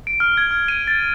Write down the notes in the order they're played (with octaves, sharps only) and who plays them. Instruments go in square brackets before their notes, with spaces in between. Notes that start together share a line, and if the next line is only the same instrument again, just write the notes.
[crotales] D7
F6
G#6
F6
D#7
A6